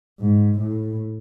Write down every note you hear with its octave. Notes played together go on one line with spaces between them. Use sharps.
G#2
A2